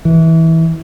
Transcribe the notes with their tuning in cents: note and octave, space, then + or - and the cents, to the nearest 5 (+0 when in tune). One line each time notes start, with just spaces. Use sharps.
E3 -20